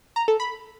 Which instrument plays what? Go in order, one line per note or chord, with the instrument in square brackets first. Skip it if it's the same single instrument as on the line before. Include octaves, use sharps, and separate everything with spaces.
[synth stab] A#5
A4
B5